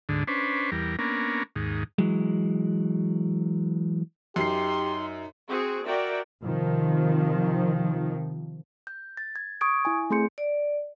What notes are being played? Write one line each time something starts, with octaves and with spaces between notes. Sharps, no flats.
D2 G#2 D3
C#4 D4 B4 C5
E2 G3 A#4
A#3 B3 C#4 D4 A#4
D#2 G#2
E3 F#3 G#3
F#2 D#4 G4 C6 C7
C4 F#4 G#4
F#4 A#4 D5 E5 G5
C3 D#3 F3
G6
A6
G#6
C#6 D#6 G#6 D7
E4 G#5
A3 C4 G#4 C6 G6 C#7
D5